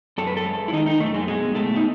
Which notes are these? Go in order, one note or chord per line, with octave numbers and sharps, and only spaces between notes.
F#2 A4
B4
A4
G#3
E4
D#3 D#4
D#4
F#2 A3
G#3
B2 G#3
B2 A3
D#4